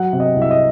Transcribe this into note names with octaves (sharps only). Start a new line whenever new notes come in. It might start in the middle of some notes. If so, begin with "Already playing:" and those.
Already playing: F#3 F#5
C3
D#5
C2
E5
D#5